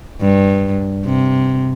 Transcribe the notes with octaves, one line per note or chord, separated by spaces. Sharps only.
G2
C3